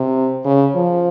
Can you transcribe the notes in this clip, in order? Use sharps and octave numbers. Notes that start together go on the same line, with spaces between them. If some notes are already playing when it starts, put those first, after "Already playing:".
Already playing: C3
C#3
F3